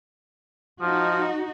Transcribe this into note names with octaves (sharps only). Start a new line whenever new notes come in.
F3 D#4 F#4